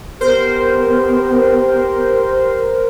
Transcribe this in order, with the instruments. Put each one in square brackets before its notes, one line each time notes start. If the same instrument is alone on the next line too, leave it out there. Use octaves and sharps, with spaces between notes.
[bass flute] B3 [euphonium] G4 [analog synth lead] A#4 [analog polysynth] C5